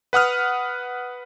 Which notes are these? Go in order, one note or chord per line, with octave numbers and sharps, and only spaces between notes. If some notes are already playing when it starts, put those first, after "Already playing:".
B4 F#5 D#6 F6